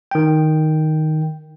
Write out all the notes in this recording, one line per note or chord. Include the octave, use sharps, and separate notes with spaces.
D#3 G5